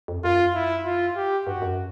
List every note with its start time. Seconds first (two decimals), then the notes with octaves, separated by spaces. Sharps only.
0.08 F2
0.24 F#2 F4
0.55 E4
0.85 F4
1.16 G4
1.47 G2 F#4
1.62 F#2